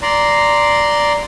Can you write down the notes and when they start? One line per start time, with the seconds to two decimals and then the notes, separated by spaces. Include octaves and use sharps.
0.02 D5 A#5 C6